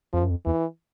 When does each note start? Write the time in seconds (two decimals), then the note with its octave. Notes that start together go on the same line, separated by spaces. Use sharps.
0.13 F2 F3
0.22 F#2
0.30 F2
0.45 E2 E3